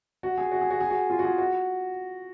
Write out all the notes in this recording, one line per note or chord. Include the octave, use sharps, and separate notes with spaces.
F#4
G#4
F#4
G#4
F#4
G#4
F#4
F4
F#4
G#4
F#4